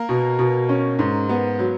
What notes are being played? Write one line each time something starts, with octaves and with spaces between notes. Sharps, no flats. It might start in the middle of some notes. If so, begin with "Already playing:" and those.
Already playing: A#3 A#4
B2
B2
C#4
G#2
B3
F#3